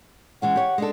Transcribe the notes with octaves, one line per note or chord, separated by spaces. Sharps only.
E3 G#3 C#4 F#5
G4 C#5
G#3 D4 A4